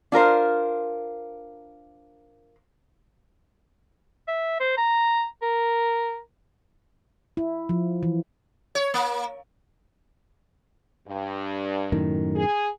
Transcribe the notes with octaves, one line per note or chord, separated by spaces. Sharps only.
D4 F4 A#4 C5
E5
C5
A#5
A#4
E4
F3
E3
C#5
A#3
G2
F#2 A2 D#3
G#4